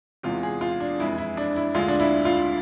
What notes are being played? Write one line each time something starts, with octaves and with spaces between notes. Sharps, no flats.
E2 C3 E3 G#3 F4
G#4
F4
D4
F2 E3 G#3 E4
E4
D4
E4
D2 D3 G#3 F4
D4
E4
F4